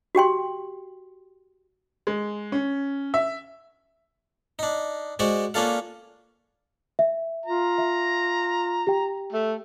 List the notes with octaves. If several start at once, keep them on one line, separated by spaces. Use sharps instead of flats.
F#4 G4 G5 C6
G#3
C#4
E5
D4 D#4
G#3 F#4 C5 D5
A#3 C#4 D4 F4 A4 F5
E5
F4 A#5
E5
G4 G5
A3